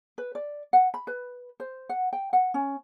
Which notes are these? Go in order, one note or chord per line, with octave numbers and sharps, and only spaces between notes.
B4
D5
F#5
B5
B4
C5
F#5
G5
F#5
C#4